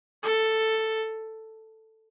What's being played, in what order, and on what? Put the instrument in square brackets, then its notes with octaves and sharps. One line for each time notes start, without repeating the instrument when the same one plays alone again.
[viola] A4